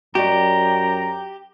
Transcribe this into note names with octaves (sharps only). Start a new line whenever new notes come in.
F#2 F#4 G4 D5 D#5 A#5